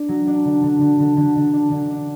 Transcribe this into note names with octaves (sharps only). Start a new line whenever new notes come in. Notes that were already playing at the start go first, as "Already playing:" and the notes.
Already playing: D4
F#3
D4
D3
D3
D3
D3
D3
D3
D4
D3
D4